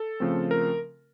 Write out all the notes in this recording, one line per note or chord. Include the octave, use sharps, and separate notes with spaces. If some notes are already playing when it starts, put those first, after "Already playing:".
Already playing: A4
C#3 F3 A3 C4
A#4